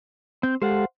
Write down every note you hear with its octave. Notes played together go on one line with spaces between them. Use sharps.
C4 G6
G#3 G4 A4 C5 F5 F#5